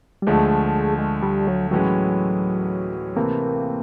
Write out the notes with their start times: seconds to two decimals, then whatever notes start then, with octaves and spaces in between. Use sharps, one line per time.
0.22 G3
0.27 D2 D3 F3 G#3 A3
0.98 G#3
1.22 G3
1.47 F#3
1.71 A2 E3 F#3 G#3 C#4
3.16 C3 E3 A3 A#3 C4